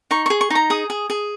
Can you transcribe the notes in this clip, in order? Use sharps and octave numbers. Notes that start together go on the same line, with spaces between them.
D#4 C#6
G#4 C#6
C#6
D#4 A#5
G#4 D#6
G#4
G#4